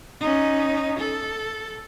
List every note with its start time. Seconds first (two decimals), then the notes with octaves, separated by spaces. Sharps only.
0.21 C#4 D#4
0.99 A4